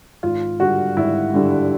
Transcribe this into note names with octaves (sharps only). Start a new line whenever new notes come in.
G#1 F4
G2 D3 G3 F#4
G#1 E4
G2 D3 G3